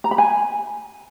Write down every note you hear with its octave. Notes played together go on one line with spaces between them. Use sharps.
A#5
B5
G#5